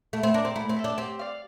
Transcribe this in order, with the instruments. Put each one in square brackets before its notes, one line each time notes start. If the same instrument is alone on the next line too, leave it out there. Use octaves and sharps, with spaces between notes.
[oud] A3 [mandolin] E4
[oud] C4
[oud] D4 [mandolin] A#4 D5
[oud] C4
[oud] A3 [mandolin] E4
[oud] C4
[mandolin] A4 E5
[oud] D4
[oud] C4 [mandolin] G4
[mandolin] D5 F5